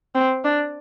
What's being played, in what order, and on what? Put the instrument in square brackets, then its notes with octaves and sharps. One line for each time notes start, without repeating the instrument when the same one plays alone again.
[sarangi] C4
D4